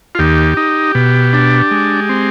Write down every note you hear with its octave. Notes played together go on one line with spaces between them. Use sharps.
F4
D#2 G4
D#4
B2
D4
G#3
C4